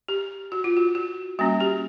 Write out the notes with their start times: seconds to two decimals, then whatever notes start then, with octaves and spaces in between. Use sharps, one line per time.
0.08 G4
0.52 F#4
0.64 F4
0.77 F#4
0.95 F#4
1.39 G3 A#3 C#4 F#4
1.60 G4